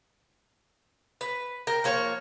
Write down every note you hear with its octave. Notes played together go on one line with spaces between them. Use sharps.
B4
A#4 G5
F3 A#3 C#5